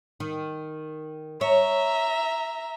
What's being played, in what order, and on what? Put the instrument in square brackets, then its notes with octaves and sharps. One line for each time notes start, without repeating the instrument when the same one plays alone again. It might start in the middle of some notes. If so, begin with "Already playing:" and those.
[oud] D#3
[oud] C#5 [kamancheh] E5 A#5